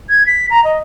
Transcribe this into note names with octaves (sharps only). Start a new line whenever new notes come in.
G#6
B6
A#5
D#5